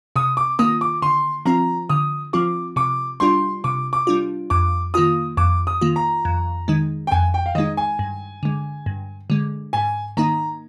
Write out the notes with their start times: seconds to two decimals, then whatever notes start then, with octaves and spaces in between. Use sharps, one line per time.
0.16 C3 D#6
0.37 D6
0.59 D#3 A#3 F4 D#6
0.81 D6
1.02 D3 C6
1.46 F3 C4 F4 A#5
1.89 D3 D#6
2.33 F3 C4 F4 D6
2.76 C3 D6
3.20 G3 D4 F4 C6
3.64 C3 D6
3.93 D6
4.07 G3 D4 F4
4.50 F2 D6
4.94 D#3 A#3 F4 D#6
5.37 F2 D6
5.67 D#6
5.81 D#3 A#3 F4
5.96 A#5
6.25 F2
6.68 D#3 G#3 D#4
7.07 G5
7.11 F2 G#5
7.34 G5
7.46 F5
7.55 D#3 G#3 D#4 D#5
7.77 G#5
7.99 G2
8.43 D3 G#3
8.86 G2
9.30 D3 G#3
9.73 G#2 G#5
10.17 D#3 A#3 D#4 A#5